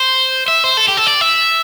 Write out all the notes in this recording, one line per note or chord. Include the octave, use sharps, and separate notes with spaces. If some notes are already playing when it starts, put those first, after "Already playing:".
Already playing: C5
E5
C5
A4
G4
A4
D5
E5